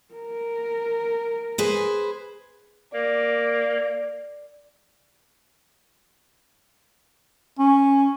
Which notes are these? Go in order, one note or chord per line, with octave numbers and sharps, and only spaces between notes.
A#4
G#4 B4 C5
A#3 D5
C#4